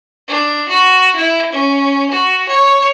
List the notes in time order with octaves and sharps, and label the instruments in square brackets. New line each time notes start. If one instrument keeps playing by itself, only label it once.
[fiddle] D4
F#4
E4
C#4
F#4
C#5